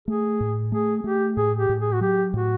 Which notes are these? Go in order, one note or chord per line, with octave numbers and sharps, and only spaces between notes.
A3 G#4
A2
A3 G#4
A3 G4
A2 G#4
G4
A2
G#4
F#4
F#3 G4
A2 F#4